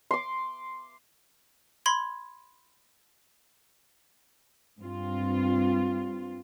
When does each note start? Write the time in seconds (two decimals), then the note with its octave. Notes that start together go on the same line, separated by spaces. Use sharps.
0.11 C6 D6
1.86 B5 C6 G#6
4.80 G2 C4 F4